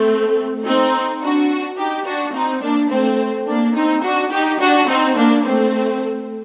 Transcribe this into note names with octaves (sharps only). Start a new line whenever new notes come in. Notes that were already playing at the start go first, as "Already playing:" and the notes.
Already playing: A3 C4
C4 D#4
D4 F#4
D#4 G4
D4 F#4
C4 D#4
A#3 D4
A3 C4
A#3 D4
C4 D#4
D4 F#4
D#4 G4
D4 F#4
C4 D#4
A#3 D4
A3 C4